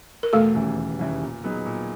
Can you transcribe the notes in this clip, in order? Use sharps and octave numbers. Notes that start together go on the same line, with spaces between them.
A#4
E1 A3 A4
D#2 C#3 E3 G3
E1
D#2 C#3 E3 G3
A#2
F#3 B3 D#4 G#4
A#2